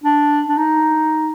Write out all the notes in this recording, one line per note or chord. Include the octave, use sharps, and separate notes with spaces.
D4
D4
D#4